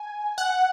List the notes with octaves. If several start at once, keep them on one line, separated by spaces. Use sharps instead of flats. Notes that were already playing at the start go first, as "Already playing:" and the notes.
Already playing: G#5
F#5